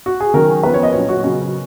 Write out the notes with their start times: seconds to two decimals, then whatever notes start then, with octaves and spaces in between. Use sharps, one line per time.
0.06 F#4
0.20 G#4
0.34 D#3 F#3 C#4 A#4
0.63 F3 B3 B4
0.74 C#5
0.83 D#5
0.93 A#2 F#3 C#4 C#5
1.09 F#4
1.24 C#3 F#3 C#4 F#4